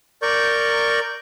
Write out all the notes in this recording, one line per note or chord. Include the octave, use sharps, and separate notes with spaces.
A#4 D5 C#6 G6